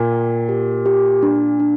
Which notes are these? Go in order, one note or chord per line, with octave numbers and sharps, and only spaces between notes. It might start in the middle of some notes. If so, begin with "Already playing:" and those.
Already playing: A#2
G5
G4
G4
D4
D4